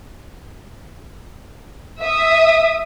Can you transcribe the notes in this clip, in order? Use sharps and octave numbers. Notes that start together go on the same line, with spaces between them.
E5 D#6